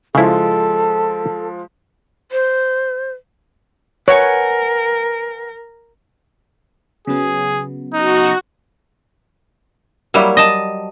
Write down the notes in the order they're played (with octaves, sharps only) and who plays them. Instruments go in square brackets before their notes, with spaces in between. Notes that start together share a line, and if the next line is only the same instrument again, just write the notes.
[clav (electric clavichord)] C#3 E4 [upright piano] F3 G#3 [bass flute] A4
[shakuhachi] C5
[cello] A#4 [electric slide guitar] B4 F#5 G#5 [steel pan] C#5
[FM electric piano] C#3 F#3 B3 [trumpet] G#4
[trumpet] D#4 [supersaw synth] F#4
[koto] F#3 G3 A#3 E4
D#5 A5